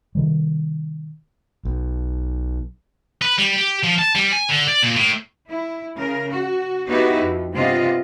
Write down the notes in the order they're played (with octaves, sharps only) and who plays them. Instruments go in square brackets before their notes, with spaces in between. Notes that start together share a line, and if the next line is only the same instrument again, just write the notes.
[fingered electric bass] C3 D#3 G3
B1
[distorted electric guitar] B4
G3
G4
F3
A5
G3
G#5
D3
D5
A#2
A2
[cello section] E4
C#3 A#4
F#4
B3 D#4 E4 F#4 G4 B4
F2
G2 C3 B3 F4 D#5